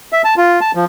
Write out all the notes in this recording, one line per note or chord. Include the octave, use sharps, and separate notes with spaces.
E5
A5
F4
A5
F3